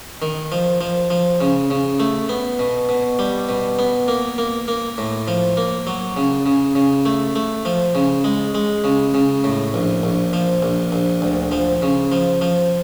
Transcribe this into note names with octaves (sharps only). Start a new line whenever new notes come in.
D#3
F3
F3
F3
C#3
C#3
A3
B3
B2
B2
G3
B2
B3
A#3
A#3
A#3
A2
F3
A#3
F#3
C#3
C#3
C#3
A3
A3
F3
C#3
G#3
G#3
C#3
C#3
A2
A#1
A#1
F3
A#1
A#1
D2
F3
C#3
F3
F3